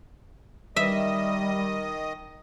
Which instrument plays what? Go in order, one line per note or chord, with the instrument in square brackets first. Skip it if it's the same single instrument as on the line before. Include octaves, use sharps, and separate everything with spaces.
[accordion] D#3 D#5 D#6 [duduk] G3 [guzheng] E5